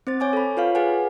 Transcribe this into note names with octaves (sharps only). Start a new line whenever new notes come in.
C4 C5 A6
C#5 G#5 D6
A4 B5
F4 B4 C#5 F5
G#4 B4 F#5 G#5